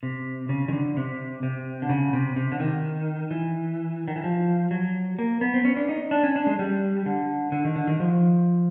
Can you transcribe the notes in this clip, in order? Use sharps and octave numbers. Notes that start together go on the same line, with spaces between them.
C3
C#3
D#3
D3
C3
C3
D3
C#3
C3
C3
D3
D#3
E3
D#3
E3
F3
F#3
A#3
B3
C4
C#4
D4
D#4
D4
C#4
D4
G#3
G3
D3
D3
D#3
D3
D#3
F3